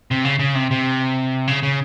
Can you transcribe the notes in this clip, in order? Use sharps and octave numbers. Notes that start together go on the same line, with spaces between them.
C3
C#3
C#3
C3
C3
C#3
C#3